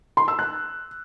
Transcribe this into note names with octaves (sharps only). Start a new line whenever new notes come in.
C6
E6
F#6